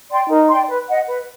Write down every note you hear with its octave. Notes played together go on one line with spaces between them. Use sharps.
D5 G5 C6
D#4 A#4
D5 G5 C6
B4
D#5 F#5
B4